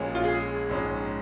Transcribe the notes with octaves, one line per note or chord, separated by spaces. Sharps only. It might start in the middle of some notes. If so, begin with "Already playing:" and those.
Already playing: A#1 A#2 G#3 C#4
F4
G#4
A#1 G#2 G#3 C#4